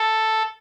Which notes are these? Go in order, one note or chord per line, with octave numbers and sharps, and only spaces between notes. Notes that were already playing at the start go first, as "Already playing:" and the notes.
Already playing: A4